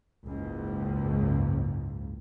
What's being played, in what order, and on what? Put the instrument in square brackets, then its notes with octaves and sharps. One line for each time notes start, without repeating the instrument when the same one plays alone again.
[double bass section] F#1 C#2 G#2